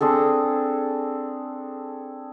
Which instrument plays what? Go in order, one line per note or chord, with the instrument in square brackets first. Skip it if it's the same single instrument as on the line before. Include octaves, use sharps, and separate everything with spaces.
[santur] C4 D4 G#4 A4